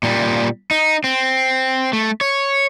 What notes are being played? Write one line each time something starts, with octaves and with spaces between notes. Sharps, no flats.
A#2 G3
D#4
C4
A3
C#5